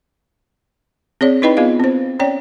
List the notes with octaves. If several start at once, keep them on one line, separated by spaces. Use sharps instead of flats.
C4 G#4 C#5 D5
D#4 E4 B4 D#5 G5 B5
B3 F4 G#4 D#5 F5
C4 C5
C#4 C#5 D5 G5